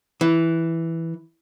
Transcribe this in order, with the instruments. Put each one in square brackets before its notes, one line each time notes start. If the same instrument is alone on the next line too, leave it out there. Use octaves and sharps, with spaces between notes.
[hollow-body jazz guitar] E3